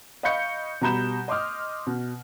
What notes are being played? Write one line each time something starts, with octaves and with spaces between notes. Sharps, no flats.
D#5 F5 B5 C#6 G6 C#7
B2 G3 A#5 B5 G6 E7
D#5 C6 D6 D#6 F6
B2